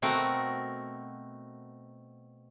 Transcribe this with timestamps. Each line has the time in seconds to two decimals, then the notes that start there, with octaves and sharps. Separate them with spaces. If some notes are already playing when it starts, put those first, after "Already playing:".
0.02 B2 A3 C4 F#4 A#4 A#5